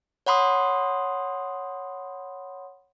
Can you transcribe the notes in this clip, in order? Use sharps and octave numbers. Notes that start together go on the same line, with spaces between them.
C#5 F#5 B5 C6 D#6